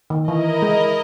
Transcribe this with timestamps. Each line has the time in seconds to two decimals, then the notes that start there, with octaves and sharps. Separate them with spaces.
0.10 D#3
0.28 E3 E4 A#4 D#5
0.62 G#3